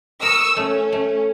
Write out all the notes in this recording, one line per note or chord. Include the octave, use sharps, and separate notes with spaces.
A#4 C#6 D#6 E6
A3 C#4
A3